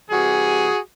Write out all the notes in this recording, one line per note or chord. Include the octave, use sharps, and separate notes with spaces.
C3 E3 G3 F#4 G#4